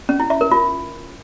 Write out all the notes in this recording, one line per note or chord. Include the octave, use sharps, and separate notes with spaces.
C#4
E4
E5
A#4
F4